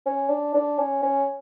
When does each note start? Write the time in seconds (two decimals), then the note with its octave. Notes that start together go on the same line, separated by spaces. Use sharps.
0.06 C#4
0.29 D4
0.54 D4
0.78 C#4
1.02 C#4